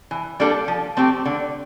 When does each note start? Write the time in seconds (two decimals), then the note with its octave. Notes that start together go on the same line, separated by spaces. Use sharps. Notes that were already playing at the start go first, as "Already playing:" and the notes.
0.11 E3
0.40 G3 A#3 D4 A4
0.68 F3
0.97 A3 C4 G4
1.25 D3